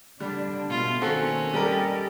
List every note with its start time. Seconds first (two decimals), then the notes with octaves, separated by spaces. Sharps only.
0.20 D3 G3 D4
0.70 B2 A3 F4
1.02 D#3 A#3 C4 C#4 F#4 A4
1.54 G3 G4 A4 A#4 D5 D#5